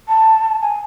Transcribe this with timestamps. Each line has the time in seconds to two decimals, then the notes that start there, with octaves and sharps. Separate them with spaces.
0.08 A5
0.61 G#5